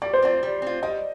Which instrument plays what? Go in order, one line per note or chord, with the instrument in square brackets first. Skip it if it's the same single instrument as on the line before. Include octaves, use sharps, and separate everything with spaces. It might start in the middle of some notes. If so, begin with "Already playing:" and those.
[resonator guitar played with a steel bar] G3 [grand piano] D5
[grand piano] C5
[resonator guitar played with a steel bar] C4 F4 [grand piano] D5
[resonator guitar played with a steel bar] G3
C4 F4
[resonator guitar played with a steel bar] G3 [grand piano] D#5